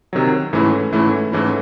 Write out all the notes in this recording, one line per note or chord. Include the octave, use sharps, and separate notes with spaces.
C3 D#3 F#3
G#2 E3 A3 C#4 E4
G#2 E3 A3 C#4 E4
G#2 E3 A3 C#4 E4